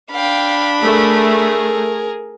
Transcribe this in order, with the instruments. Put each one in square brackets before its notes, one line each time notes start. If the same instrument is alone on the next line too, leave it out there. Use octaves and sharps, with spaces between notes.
[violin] D4 B5 [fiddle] F5 G5
[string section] A3 [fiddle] G#4 A#4